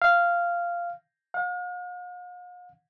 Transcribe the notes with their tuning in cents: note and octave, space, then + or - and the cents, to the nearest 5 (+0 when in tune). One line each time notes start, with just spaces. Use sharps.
F5 -10
F5 +45